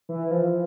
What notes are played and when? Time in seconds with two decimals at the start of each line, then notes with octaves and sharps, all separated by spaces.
0.09 E3
0.31 F3